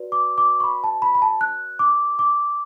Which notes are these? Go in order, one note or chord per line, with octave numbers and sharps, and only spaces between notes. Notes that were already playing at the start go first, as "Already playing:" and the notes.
Already playing: F#4 B4 D5
D6
D6
C#6
B5
A5
B5
B5
A5
F#6
D6
D6